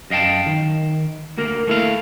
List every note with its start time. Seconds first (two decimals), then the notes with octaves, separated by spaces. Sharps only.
0.10 F#2 D#5 F5 G5 A5
0.46 D#3
1.38 D2 A#3 A#4
1.68 A3 E4 F5